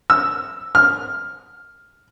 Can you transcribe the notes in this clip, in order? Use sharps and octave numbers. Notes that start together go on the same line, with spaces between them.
E6
F6